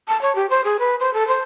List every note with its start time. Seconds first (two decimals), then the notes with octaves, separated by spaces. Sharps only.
0.08 A5
0.22 C#5
0.35 G4
0.50 C5
0.64 G#4
0.79 B4
1.00 C5
1.14 A4
1.28 C5